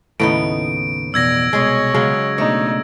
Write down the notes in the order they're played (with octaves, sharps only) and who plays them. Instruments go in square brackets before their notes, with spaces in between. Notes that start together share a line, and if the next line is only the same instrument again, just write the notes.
[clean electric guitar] D#2 C#3 [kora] A2 B3 D#4 [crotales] D7
[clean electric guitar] F2 B2 E3 [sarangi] D5 [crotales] E6 G#6 A#6
[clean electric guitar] C2 B2 [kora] G#3 G#4 [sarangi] C#5
[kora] C#3 F#3 G#3
[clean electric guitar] B2 A3 D4 [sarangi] D#4 [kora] C#5